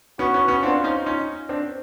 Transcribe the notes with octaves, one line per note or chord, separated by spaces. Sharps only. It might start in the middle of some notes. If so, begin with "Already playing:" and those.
B3 C#4 F#4
B3 C#4
B3 C#4
C4 D4 F4
C#4 D#4
C#4 D#4
C4 D4